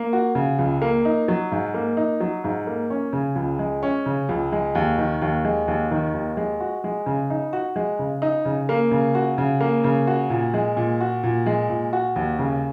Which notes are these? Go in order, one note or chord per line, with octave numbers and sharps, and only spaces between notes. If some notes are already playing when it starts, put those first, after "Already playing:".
Already playing: A#3
F#4
C#3
C#2
A#3
D#4
F#3
G#2
A#3
D#4
F#3
G#2
A#3
C#4
C#3
C#2
G#3
C#4
C#3
C#2
G#3
D#2
D#3
D#2
G#3
D#2
D#3
D#2
G#3
F#4
G#3
C#3
D#4
F#4
G#3
C#3
D#4
C#3
A#3
C#3
F#4
C#3
A#3
C#3
F#4
A#2
G#3
A#2
F#4
A#2
G#3
A#2
F#4
D#2
C#3